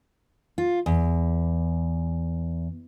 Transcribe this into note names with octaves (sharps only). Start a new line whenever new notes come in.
F4
E2